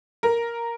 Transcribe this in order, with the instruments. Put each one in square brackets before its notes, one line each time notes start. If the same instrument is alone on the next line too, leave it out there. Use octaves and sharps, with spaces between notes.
[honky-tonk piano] A#4